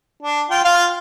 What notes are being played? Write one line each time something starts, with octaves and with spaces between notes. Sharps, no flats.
D4
F4 G5
F4 F5